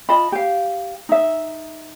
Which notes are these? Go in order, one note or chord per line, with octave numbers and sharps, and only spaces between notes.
F4 D#5 A5 B5
G4 F5
D#4 E5